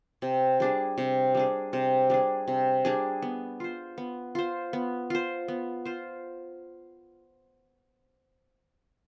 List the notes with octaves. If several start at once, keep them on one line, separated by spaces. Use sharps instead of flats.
C3
G3 D4 G#4
C3
G3 D4 G#4
C3
G3 D4 G#4
C3
G3 D4 G#4
B3
F4 C5
B3
F4 C5
B3
F4 C5
B3
F4 C5